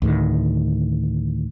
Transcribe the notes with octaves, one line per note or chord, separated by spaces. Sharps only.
D2 A2 D#3